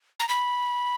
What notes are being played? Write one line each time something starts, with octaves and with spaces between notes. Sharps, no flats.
A#5
B5